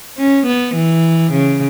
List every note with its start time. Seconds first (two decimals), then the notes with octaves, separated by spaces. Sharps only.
0.18 C#4
0.46 B3
0.75 E3
1.32 C#3